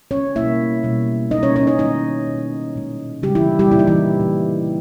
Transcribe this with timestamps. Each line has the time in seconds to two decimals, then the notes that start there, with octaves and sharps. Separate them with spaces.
0.11 C#4 C#5
0.36 B2 G3 A#3 E4 E5
0.83 B2 G3 A#3
1.31 B2 G3 A#3 D#4 D#5
1.43 C#4 C#5
1.56 C#4 C#5
1.67 D#4 D#5
1.79 D#3 G#3 D#4 D#5
2.27 B2 A#3
2.76 A#2 G#3
3.23 C#3 G3 G4
3.27 G#3
3.35 E3 E4
3.59 G3 G4
3.71 A#2 A#3 E4
3.79 D#4
3.87 E3 E4
4.20 A#2 A#3